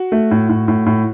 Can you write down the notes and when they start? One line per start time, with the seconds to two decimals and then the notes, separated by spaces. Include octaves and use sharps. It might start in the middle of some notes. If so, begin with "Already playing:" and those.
Already playing: F#4
0.12 A3
0.31 A2
0.49 A2
0.68 A2
0.86 A2